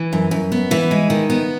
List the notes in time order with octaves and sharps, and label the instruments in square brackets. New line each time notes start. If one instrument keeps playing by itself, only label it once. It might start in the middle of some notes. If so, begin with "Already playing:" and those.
Already playing: [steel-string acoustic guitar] E3
F#2
F#2
B3
E3
G#3
D#3
B3